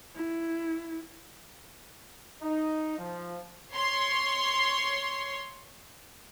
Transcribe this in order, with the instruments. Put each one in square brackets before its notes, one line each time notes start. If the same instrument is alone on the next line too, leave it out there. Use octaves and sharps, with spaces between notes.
[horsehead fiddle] E4
[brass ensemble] D#4
F3
[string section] C#5 C6